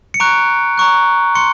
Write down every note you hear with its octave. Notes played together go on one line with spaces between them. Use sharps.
C#7
A#5 C#6 F#6 D7
A#5 C#6 F#6
C6 C#7